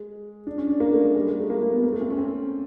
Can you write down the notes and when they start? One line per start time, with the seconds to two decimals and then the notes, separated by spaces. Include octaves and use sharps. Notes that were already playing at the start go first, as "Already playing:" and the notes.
Already playing: G#3
0.47 D4
0.58 C#4
0.69 D4
0.80 A#3
0.93 A3
1.04 G#3
1.15 G3
1.27 G#3
1.38 A3
1.50 A#3
1.62 A#3
1.72 B3
1.83 A#3
1.93 A3
2.01 C4
2.10 C#4
2.18 C4